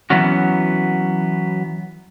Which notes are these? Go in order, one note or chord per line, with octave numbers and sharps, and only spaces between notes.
E3 F#3 B3 C#4 F#4